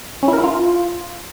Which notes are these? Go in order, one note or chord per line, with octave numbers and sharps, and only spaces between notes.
C#4
E4
A#4
E4
F4